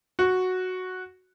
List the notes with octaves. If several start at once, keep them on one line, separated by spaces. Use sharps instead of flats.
F#4